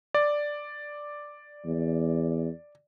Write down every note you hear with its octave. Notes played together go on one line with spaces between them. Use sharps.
D5
E2